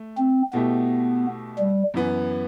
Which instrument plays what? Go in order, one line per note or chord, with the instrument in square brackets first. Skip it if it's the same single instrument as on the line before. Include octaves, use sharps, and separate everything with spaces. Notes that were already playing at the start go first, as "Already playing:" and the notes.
Already playing: [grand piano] A3
[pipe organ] C4
[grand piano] B2 A3 E4 G4 [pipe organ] B3
[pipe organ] G3
[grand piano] F#2 E3 B3